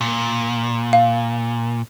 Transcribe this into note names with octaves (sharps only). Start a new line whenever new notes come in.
A#2
F5